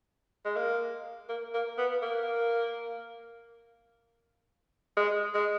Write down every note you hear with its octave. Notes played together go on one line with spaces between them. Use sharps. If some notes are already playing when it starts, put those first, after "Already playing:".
G#3
A#3
A#3
A#3
B3
A#3
G#3
G#3